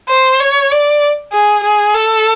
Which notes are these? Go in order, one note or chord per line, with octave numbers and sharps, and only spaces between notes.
C5
C#5
D5
G#4
G#4
A4